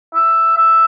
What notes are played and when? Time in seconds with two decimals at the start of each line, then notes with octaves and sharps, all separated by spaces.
0.15 E5
0.57 E5